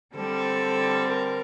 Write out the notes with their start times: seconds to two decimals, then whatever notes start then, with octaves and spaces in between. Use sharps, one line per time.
0.14 D3 G3 C4 A4
1.08 A#4